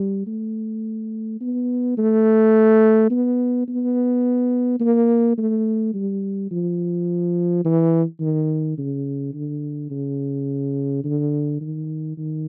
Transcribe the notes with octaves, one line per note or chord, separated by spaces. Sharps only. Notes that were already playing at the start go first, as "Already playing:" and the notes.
Already playing: G3
A3
B3
A3
B3
B3
A#3
A3
G3
F3
E3
D#3
C#3
D3
C#3
D3
D#3
D#3